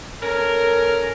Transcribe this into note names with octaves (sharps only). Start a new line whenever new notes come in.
C#4 A4 A#4